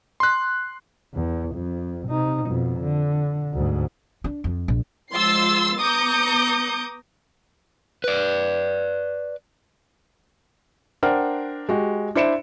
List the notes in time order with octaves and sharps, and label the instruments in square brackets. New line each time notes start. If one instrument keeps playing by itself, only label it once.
[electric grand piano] C6 F#6
[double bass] E2
F2
C3 D#4
F2 B2
D3
D2 G#2
[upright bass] D4
F2
A#1
[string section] F3 G#3 C6 E6 A6 C7
B3 A#5 D6 D#6 G6 C#7
[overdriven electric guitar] B4 D5
[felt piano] D4 A#4 C5 F#5 G5
G#3 F#4 G4
D4 E4 C5 C#7 D7 E7